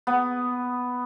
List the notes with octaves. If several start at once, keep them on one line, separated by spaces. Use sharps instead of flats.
B3